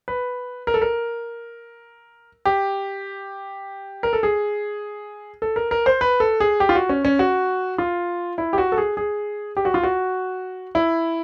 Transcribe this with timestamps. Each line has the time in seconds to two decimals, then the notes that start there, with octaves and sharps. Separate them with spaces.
0.08 B4
0.67 A#4
0.74 A4
0.82 A#4
2.45 G4
4.03 A#4
4.13 A4
4.23 G#4
5.42 A4
5.56 A#4
5.71 A#4
5.86 C5
6.01 B4
6.20 A4
6.40 G#4
6.60 G4
6.69 F4
6.75 F#4
6.89 C#4
7.05 C#4
7.19 F#4
7.78 F4
8.38 E4
8.53 G4
8.58 F#4
8.72 A4
8.78 G#4
8.97 G#4
9.57 G4
9.65 F#4
9.74 F4
9.83 F#4
10.75 E4